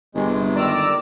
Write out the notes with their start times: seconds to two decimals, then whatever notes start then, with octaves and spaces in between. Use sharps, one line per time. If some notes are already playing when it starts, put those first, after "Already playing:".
0.15 G1 C3 G#3
0.55 D#3 D5 A#5 D6 E6